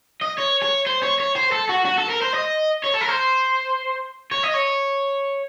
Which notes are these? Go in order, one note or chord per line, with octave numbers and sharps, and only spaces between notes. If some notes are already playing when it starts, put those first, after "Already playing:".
D#5
C#5
C#5
C5
C#5
C#5
C5
A4
F#4
F#4
A4
A#4
C5
D#5
C#5
A4
A#4
C5
C#5
D#5
C#5